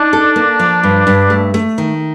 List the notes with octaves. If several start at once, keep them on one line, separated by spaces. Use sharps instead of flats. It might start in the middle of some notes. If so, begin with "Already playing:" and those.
Already playing: D4 D#4
A4
A#3
F3
G2
G2
A3
A3
D#3